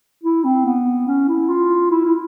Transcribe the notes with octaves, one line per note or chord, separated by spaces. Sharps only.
E4
C4
B3
C#4
E4
F4
E4
E4